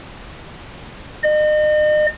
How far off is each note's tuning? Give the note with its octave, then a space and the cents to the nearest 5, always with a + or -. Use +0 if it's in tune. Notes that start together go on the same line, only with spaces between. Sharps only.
D#5 -40